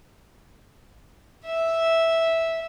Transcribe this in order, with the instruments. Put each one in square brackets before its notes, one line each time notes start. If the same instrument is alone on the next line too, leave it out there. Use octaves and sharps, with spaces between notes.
[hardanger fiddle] E5